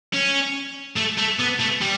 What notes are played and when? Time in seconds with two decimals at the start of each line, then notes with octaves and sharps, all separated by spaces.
0.14 C#4
0.97 A3
1.18 A3
1.40 B3
1.60 A3
1.82 G3